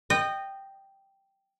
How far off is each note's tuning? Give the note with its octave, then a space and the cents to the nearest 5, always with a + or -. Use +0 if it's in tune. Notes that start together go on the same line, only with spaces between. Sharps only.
D#5 -20 G5 +0